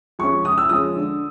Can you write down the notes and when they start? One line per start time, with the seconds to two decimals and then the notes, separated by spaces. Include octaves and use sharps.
0.19 F3 G#3 C#4 C#6
0.44 C#3 D#6
0.58 E6
0.69 F3 G#3 C#4 D#6
0.96 D3